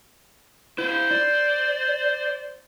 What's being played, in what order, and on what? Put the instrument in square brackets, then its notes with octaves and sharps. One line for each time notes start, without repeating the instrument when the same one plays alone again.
[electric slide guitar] E4 D#5 [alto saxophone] C5
[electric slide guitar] D5